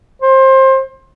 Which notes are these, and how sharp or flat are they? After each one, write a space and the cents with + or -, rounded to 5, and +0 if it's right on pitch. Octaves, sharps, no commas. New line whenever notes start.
C5 +25